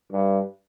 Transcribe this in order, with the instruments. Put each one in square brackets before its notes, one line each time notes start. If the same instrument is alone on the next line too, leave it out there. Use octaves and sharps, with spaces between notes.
[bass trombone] G2